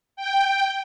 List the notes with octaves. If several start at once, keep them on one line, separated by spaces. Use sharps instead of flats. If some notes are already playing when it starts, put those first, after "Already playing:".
G5